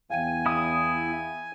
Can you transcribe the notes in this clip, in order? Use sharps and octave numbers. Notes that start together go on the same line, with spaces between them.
E2 F5 G5 G#5 D#7
E4 D#6